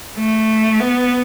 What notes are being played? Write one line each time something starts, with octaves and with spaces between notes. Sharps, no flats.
A3
B3